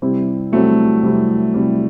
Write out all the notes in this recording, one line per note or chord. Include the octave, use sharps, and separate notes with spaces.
C3 G3 C4 E4
C3 F#3 G3 A3 C4 E4
C3 G3 C4 E4
C3 G3 C4 E4